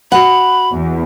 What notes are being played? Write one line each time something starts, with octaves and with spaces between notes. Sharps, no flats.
F#4 F#5 B5
E2